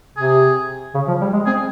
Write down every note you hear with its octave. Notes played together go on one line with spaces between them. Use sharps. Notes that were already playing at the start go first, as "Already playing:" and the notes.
C3 G#4
C#3
F3
G3
G#3
C4 G#4